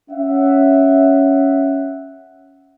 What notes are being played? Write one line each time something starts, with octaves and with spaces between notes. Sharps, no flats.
C#4 E5 F#5